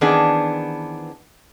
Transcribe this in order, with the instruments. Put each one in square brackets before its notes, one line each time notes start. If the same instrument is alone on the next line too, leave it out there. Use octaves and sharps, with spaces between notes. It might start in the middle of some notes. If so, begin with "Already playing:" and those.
[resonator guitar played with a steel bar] D#3 E3 B3 C4 D4 G#4